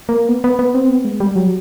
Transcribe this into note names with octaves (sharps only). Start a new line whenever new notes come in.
A#3
B3
B3
B3
C4
B3
G#3
G3
F#3